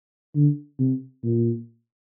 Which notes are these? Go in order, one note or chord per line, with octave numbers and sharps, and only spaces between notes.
D3
C3
A#2